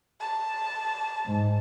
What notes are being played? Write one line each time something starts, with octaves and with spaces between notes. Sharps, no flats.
A5
G#2